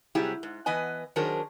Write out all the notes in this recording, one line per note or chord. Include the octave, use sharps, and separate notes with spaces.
C3 F#3 G3 E4 G4 G#4
G#2
E3 B3 B4 D#5 G#5
D#3 F#3 D4 G#4 A#4 C5